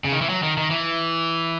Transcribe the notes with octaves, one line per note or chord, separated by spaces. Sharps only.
C#3
D#3
E3
F#3
D#3
D#3
E3